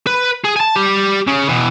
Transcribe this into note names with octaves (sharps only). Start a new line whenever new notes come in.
B4
G#4
G#5 A5
G3 G4
C#3 C#4
B2 E3